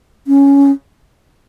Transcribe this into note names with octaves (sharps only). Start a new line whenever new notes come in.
C#4